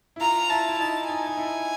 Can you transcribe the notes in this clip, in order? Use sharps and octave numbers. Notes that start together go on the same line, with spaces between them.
E4
F4 A#5
E4 A5
E4
D#4 A5
D#4 G#5
D#4
E4